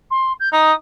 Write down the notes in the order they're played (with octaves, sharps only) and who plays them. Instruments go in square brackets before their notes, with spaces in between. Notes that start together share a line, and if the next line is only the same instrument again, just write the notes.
[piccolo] C6
G6
[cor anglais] D#4 [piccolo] D#6